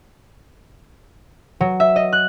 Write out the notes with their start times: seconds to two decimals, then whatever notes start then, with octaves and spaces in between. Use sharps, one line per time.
1.61 F#3
1.80 E5
1.96 D#5
2.13 F#6